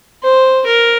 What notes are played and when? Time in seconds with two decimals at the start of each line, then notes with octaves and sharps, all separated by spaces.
0.23 C5
0.66 A#4